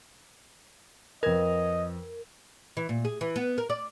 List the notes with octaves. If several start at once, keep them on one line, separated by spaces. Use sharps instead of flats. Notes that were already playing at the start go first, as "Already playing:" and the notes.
F2 A#4 B4 D#5 G#6
E3
A#2
G#4
E3
B3
A#4
D5